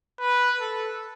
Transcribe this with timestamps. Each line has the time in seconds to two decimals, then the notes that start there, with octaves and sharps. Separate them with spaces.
0.20 B4
0.60 A4